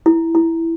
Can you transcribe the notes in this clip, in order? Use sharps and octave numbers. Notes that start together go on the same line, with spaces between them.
E4
E4